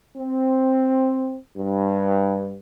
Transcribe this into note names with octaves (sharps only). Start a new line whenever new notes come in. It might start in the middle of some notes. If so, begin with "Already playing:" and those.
C4
G2